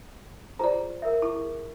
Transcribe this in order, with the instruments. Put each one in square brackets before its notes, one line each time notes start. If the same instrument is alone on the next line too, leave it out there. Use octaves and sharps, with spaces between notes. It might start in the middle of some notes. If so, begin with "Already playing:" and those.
[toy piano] F4 G#4 A#5 [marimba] C5 D5
[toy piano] A#4 E5
[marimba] E4 [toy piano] C#6
[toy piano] G#4